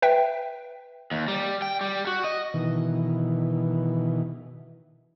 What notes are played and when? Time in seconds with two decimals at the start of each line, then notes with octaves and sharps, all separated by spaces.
0.02 B4 E5 G5
1.11 D#2
1.28 G3
1.62 G5
1.81 G3
2.07 F#4
2.24 D#5
2.54 B2 D#3 E3